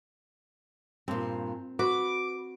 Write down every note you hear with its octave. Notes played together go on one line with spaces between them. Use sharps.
G2 A#2 C4
F#4 B4 D6